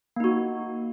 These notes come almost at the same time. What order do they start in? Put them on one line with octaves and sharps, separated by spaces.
A#3 D#4 F#4